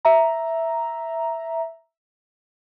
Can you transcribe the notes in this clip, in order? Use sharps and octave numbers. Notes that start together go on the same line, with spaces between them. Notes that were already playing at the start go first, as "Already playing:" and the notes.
E5 A#5